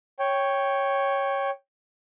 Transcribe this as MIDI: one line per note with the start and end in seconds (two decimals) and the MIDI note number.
0.19 1.50 73
0.19 1.50 79